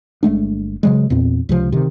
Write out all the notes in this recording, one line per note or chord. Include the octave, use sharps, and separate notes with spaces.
G1 G#3 A3 D4
C#3 F#3 G#3
E2 A#2 C4
C#2 C3 F3
C3 D#3